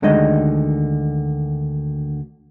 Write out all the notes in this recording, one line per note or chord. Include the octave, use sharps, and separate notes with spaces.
D2 D3 D#3 G#3 D#5